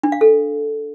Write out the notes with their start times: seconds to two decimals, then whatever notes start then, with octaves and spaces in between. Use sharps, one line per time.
0.03 D4
0.12 F5
0.21 A4